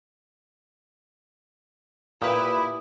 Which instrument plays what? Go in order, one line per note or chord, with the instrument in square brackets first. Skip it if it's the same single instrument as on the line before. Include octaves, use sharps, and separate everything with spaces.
[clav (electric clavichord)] A#2 [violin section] E4 [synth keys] G4 B4 [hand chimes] D#6